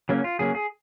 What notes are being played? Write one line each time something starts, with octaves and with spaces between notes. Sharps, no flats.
C#3 F#3 A#3 C#4
F4
C#3 F#3 A#3 C#4 G#4
G#4